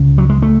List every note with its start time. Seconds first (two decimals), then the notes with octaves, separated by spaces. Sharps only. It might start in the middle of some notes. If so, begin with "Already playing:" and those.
Already playing: C#2 C#3
0.18 F#3
0.30 G#3
0.42 A3